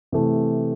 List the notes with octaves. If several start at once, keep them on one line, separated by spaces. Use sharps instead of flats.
C3 E3 A3